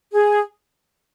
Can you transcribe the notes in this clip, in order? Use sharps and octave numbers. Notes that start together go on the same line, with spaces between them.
G#4